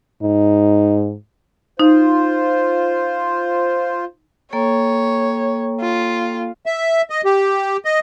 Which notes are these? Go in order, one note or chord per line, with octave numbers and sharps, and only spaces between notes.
G#2 D#4
D#4 F4 C5
A#3 A4 C#5 G5
F4
E5
D#5
G4
D#5